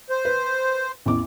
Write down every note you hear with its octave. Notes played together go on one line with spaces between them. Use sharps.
C5
B4
A1 E2 D6